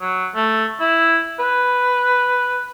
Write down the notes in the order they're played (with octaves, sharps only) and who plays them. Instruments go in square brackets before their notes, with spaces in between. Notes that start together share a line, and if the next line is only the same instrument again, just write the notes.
[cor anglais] F#3
A3
E4
B4